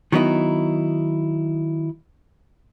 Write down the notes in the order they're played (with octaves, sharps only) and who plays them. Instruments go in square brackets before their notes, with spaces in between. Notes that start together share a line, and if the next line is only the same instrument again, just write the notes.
[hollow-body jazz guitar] D#3 F#3 B3 D#4 E4